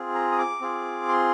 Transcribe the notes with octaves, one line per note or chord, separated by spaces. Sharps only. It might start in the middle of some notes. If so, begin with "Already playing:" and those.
Already playing: C4 F4 G#4
A#5
D#6
D6
C4 F4 G#4
C6